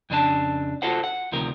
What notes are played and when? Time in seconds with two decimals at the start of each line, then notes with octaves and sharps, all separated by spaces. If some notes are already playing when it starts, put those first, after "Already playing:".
0.10 F2 C#3 D4 B4 A5
0.82 F4 F#4 A4 C5 F#5
1.04 F#5
1.32 D2 C3 D#3 F3 A#4